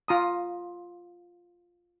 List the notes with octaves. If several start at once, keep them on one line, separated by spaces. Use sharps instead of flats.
F4 A#5 D#6